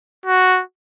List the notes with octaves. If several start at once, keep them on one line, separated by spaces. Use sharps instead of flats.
F#4